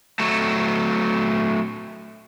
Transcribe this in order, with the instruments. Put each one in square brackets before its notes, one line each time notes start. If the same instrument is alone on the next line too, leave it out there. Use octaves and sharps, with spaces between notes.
[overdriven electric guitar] F#3 A3